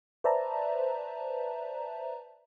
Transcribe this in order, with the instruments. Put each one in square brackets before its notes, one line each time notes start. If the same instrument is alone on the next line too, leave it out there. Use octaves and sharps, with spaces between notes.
[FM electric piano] B4 C5 D5 E5 A5 A#5